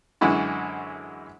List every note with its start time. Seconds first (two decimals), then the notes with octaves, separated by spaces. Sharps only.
0.21 F#2 D3 E3 G#3 E4 F#4